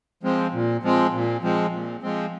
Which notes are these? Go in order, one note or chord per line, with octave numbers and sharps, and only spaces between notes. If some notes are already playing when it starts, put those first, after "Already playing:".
F3 G#3 C4
A#2
F3 G#3 C4
A#2
F3 G#3 C4
A#2
F3 G#3 C4